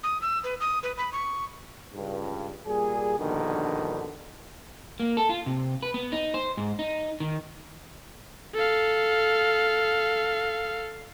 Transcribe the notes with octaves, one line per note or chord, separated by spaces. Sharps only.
D#6
E6
B4
D#6
B4
B5
C#6
C#2 G2
A#2 G3 G#4
A#1 G2 B2 D3 D#3
A#3
A4
F4
C3
B4
B3
D#4
C5
G#2
D#4
D#3
A4 F5